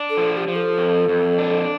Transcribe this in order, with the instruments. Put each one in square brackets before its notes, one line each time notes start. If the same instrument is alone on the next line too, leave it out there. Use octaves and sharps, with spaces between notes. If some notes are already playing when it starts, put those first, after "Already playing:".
Already playing: [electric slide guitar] D4
[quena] A4
[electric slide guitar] F3
[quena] A4
G4
[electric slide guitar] F3
[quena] A4
[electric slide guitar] F2
F2
D4